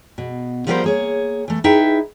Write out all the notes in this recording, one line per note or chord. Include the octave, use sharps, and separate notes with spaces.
B2
F3 G3 B3 F#4 A#4 C5
A#3 G#4 C#5
E3 A3
D#4 E4 G#4 B4 E5 G5